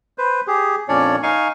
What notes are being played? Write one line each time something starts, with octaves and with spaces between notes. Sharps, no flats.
B4 C5
G4 G#4
F2 A#2 C#4 D4 C#5 D5
D#4 F5 G#5 C#6